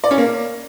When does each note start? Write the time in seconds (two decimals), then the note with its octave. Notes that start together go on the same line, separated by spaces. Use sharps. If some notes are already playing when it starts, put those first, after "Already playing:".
0.04 D5
0.11 C#4
0.18 A#3